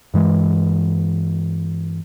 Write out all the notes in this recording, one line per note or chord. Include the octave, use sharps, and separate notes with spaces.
G2 E3 G#3